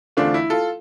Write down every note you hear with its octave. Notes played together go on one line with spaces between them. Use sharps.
E2 D3 A3 C4 D4 F4
E4
F4 A4